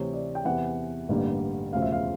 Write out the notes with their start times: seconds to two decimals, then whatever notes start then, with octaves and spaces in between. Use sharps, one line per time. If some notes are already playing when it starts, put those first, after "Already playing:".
Already playing: D2 C3 E3 C#5
0.13 D5
0.35 G5
0.45 E2 C3 E3 F#5
1.09 A1 G2 D3 G3 A#3
1.73 E1 D2 C#3 F3 F5
1.82 E5
1.92 F5